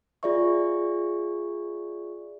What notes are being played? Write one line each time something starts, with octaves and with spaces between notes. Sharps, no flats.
F4 G#4 D5 E5 C#6